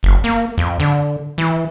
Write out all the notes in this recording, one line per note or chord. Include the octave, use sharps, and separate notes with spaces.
F#1
A#3
F2
D3
E3